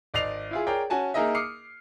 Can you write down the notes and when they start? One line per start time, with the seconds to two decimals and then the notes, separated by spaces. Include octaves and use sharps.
0.14 G#1 D5 D#5 C7 F7
0.51 E4 F4 G#4
0.67 G#4 A#4 C#5 D5 G5
0.90 C#4 F#4 G#5 A5
1.14 A#3 D#4 G#4 A#4 D#5 E5
1.35 D6 D#6 F6 C7 C#7